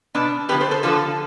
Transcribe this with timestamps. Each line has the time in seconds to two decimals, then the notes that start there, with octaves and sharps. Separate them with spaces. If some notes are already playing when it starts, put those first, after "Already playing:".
0.15 B2 B3 D4
0.49 D3 F3 B3 G4 B4
0.60 A4 C5
0.71 A4 C5
0.83 D3 F3 B3 F4 A4